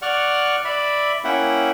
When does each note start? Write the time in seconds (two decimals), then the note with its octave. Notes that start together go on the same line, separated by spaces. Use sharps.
0.02 D5 F#5 C#6 F6
0.65 D5 E5 B5
1.24 A#3 C#4 E4 E5 F#5 G5